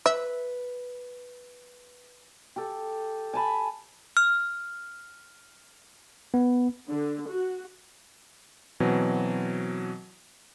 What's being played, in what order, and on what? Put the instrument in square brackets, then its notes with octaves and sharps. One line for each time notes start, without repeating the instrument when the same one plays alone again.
[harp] B4 [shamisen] E5
[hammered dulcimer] G4 A4
G#5 A5 B5
[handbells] F6
[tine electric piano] B3
[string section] D3
F#4
[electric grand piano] B2 E3 F#3 C4